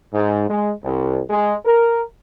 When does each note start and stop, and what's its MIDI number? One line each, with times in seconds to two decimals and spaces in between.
0.13 0.49 44
0.49 0.71 56
0.83 1.20 36
1.30 1.54 56
1.64 2.01 70